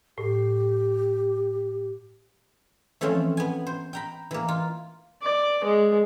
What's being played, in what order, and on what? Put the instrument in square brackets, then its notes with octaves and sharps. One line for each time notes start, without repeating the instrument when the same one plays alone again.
[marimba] A2 [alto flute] G4
[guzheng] E3 F3 A3 C4 C#4
B3 G#5
C5
G5 A#5 B5
E3 A#3
F4
[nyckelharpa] D5
G#3